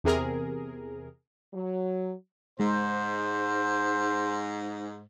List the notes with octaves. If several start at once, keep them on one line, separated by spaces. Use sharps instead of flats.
E2 C3 G#4 A#4
F#3
G#2 G#3 C5